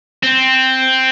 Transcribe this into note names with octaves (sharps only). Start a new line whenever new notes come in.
C4